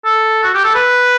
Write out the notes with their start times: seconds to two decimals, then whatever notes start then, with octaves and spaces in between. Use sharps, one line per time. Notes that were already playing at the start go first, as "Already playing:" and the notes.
0.05 A4
0.44 F#4
0.54 G4
0.64 A4
0.75 B4